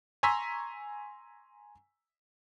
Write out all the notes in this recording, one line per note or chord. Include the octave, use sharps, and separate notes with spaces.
G#5 A#5 C6 C#6 E6 B6